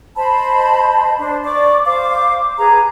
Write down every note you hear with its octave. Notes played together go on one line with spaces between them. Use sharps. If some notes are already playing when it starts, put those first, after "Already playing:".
C5 D#5 A5 B5
D4 C5
D5 C#6 D6
C5 F5 D6
G#4 B4 A#5